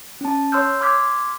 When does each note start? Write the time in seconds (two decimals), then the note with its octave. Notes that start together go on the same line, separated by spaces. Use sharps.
0.21 C#4 A5
0.52 C#5 C6 E6 F6 G6
0.81 C6 D6 F6 G#6 B6